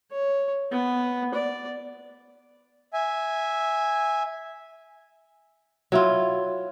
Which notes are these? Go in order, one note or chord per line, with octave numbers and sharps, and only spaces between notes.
C#5
B3
D5
E5 G#5
F#3 E4 F4